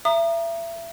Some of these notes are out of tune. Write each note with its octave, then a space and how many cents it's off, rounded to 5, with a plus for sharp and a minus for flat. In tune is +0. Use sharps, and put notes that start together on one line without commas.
E5 +30 A#5 +0 D#6 -35